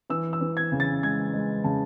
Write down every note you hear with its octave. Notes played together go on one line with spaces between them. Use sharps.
E3 E6
E6
E3
G#6
C#3
A6
G#3 G#6
G#3
C#3 A5